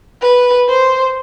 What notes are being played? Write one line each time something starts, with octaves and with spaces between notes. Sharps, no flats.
B4
C5